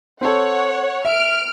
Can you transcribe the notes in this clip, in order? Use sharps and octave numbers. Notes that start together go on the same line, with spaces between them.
C4 A4 C#5 F#5
E5 F6 D7